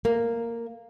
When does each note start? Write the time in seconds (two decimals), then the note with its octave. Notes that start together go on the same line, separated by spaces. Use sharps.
0.05 A#3